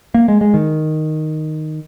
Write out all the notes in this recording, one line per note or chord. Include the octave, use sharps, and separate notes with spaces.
A#3
G#3
G#3
D#3